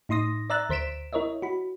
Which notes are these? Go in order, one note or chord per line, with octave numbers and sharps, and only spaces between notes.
A2 D#4 C6 D#6 A#6
D5 E5 A#5 E6 F#6 A6
D2 C5 B6 D7 E7
E4 A#4 C#5 D#5 E5
F#4 B5